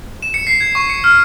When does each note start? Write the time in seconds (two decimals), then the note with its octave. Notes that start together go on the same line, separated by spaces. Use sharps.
0.22 E7
0.34 C#7
0.47 C7
0.61 G#6
0.75 C#6
0.90 C#7
1.04 F6